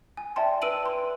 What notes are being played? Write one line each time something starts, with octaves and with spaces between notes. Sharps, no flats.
G#5
D5 E5 G5 A5 C6
B4 E6 D7 D#7 F#7
C6